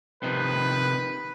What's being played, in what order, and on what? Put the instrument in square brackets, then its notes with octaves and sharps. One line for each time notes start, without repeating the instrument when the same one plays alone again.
[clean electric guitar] C3 D#3 F3 [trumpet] B4